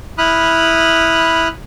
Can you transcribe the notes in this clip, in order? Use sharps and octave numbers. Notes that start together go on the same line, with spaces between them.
E4 B5 D#6 F6 F#6